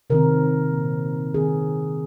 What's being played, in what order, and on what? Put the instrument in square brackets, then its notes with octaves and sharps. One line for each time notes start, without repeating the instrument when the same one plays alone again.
[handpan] C3 D#3 C4 A#4
A#2 A#3
D#3 C4 G#4